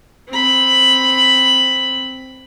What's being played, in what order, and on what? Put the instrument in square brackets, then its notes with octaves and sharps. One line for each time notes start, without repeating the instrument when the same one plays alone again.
[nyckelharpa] C4 B5